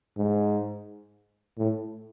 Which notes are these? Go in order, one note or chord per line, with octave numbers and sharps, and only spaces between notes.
G#2
A2